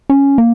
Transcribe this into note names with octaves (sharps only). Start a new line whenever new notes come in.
C#4
A#3